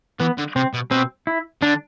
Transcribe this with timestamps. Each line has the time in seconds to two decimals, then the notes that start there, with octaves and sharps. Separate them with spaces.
0.20 E3 B3
0.38 D3
0.56 C3 C4
0.73 B2
0.91 B2 C4
1.27 E4
1.61 D3 D4